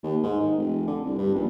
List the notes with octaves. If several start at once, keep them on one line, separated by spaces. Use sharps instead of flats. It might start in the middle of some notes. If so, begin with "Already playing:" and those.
D#2
G#2
D#3
F1
D3
C2
G2
A#1